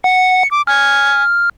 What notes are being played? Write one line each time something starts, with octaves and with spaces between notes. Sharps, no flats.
F#5 C#7
D6
G#5 F6